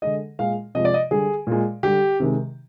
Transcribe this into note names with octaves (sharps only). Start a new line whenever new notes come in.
D3 G#3 D#5
A#2 G#3 F5
C3 F3 G#3 D#5
D5
D#5
D3 G3 G#4
A#2 G#3
D3 G3 G4
C3 D#3 G#3